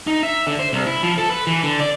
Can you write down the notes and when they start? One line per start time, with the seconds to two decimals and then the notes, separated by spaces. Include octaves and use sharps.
0.07 D#4
0.23 E5
0.47 D3
0.59 C5
0.73 C2
0.87 E4
1.03 F3
1.18 A4
1.30 B4
1.47 E3
1.63 D3
1.80 D5